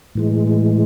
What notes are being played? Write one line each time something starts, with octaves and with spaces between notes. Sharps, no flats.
A2 E3 G#3